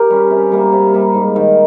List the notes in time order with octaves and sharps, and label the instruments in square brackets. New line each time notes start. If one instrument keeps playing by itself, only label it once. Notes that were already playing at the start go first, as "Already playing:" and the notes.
Already playing: [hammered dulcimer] G4 A#4
G3 C#4
C3
G3 A#3
C3
G3 A#3
G#2
D#3 A#3